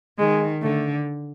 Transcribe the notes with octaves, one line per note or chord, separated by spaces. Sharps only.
D#3 G#3
D3 A3